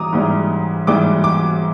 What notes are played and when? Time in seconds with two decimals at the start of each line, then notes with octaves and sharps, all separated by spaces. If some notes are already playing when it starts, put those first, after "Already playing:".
Already playing: G#2 E3 G3 A#5 D6 D#6
0.13 G#2 E3 G3
0.87 G#2 E3 G3 D6
1.24 D6